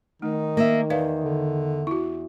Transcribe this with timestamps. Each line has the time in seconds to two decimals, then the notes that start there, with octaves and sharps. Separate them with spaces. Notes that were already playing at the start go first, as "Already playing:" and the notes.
0.22 D#3 A3 D#4
0.57 A#3 E5
0.90 E2 B4 D5 F5
1.24 D3
1.87 E4 F#4